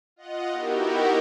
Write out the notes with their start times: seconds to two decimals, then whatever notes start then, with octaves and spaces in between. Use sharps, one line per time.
0.16 F4 D#5 F#5
0.52 B3 D#4 E4 F#4 G4 A#4